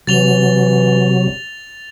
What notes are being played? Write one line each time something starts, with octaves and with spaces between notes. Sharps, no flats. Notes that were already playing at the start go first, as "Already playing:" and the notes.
C3 E3 F#3 A6 F7 G7